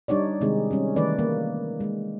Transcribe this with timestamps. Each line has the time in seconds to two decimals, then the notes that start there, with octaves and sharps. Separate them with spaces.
0.08 G3 D4 D#4 C#5 D5
0.41 C3 D#3 G#3 C4 D#4 G#4
0.71 G3 C#4
0.96 D#3 E3 A3 D#4 B4 D5
1.19 A#3
1.80 G#3 A#3